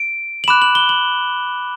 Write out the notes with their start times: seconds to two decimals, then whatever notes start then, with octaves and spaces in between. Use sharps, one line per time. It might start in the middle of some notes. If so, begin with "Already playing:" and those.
Already playing: D7
0.44 F#7
0.48 B5 D6 F#6 E7
0.62 F#7
0.75 G7
0.89 F#7